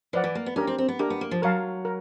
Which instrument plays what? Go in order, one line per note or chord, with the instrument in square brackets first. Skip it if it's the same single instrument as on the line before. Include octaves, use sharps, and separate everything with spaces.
[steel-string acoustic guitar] F3 [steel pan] B4 D5 F#5
[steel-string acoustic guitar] E3
A#3
B3
[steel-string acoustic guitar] C#4 [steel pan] D4 G4 A#4
[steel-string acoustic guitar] C4
C4
B3
[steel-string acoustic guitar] A#3 [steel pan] D4 G4 A#4
[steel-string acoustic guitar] B3
A#3
F3
[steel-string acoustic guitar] F#3 [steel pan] A#4 C#5 F5 A5
[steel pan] A#4